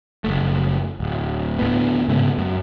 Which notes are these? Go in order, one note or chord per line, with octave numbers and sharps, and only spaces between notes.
F#1 C#2 A3
D1
D2 A2 B3
G#2 C#3 A3 B3
F#2